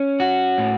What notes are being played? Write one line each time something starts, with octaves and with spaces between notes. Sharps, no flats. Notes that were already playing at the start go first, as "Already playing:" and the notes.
Already playing: C#4
F#4
A2